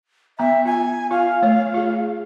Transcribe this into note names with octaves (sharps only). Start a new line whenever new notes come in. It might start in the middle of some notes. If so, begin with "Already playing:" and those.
B3 E5 A#5
F4 G#5
F4 F5
A3 C#5
F4 G#4